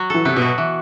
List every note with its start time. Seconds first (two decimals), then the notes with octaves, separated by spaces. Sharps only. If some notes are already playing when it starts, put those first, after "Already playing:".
Already playing: F#3 F#4
0.10 E3 A4
0.25 C3 B3
0.36 B2
0.42 F#4
0.58 E3